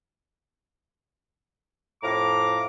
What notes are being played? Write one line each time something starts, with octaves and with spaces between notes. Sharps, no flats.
F2 A2 F5 A#5 D6